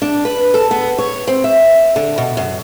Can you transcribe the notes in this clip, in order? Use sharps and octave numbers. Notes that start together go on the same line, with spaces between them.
D4
B4
A4
B3
C#5
C4
E5
D3
B2
F#2